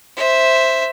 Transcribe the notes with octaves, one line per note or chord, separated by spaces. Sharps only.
C5 E5